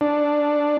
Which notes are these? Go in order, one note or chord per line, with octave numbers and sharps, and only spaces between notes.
D4